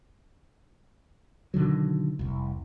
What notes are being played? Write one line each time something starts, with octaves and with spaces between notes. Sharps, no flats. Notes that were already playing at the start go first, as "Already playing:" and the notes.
B2 D3 D#3 F#3
F1 C2